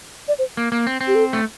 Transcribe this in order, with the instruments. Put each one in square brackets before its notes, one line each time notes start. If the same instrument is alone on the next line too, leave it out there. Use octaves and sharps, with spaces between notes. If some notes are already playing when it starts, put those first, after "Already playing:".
[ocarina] D5
C5
[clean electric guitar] A#3
A#3
C4
C4
[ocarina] G4
A4
[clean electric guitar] A3